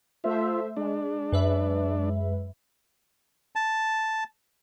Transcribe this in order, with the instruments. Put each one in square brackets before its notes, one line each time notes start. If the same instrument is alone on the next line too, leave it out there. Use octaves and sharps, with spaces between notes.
[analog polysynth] A3 C5 E5 [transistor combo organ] F4
[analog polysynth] G#3 [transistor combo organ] D4
[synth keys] F#2 B4 E5
[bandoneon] A5